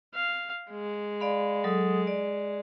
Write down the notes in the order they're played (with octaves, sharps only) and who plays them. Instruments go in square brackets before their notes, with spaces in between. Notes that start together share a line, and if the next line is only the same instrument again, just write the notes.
[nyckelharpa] F5
G#3
[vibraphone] D5 F5 B5
F#3 A4 D#6
D5